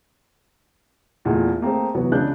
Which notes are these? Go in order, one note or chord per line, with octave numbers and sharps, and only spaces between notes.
E2 A#2 G#3 A3
A3 A#3 C4 G#4
C3 E3 F#3 B3
C#2 C#3 D4 F#6 G6